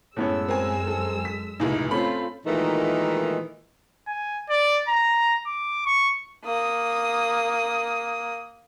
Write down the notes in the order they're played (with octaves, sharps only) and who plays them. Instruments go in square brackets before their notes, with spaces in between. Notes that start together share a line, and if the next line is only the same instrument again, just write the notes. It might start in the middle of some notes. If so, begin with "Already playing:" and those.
[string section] F#2 G#3 E6 [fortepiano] A2 B3 C#4
[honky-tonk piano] C4 A#4 G#5
[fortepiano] A4
[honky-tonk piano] B6
[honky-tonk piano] F1 C#2 A#2 [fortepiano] D#4 E4
[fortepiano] A3 C4 C#4 [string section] F4 [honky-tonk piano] B5
[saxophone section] A#2 D#3 E3 G#3 A3 D#4
[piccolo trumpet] G#5
D5
A#5
D6
C#6
[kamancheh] A#3 D#6